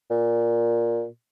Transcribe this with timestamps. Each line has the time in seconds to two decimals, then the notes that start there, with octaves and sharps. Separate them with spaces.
0.11 A#2